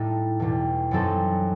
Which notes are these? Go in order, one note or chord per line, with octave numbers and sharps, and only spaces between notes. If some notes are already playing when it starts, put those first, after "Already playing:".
Already playing: A2 G3 D#4 A4
E2 B2 G3
F#2 F#3 C4 D#4 A4